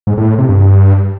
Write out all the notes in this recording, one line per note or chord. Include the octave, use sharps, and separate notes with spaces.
G#2
A2
A2
C3
G2